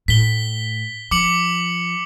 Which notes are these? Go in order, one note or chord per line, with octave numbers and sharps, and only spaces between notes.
A2 B6 G7
F3 D6 C#7 F#7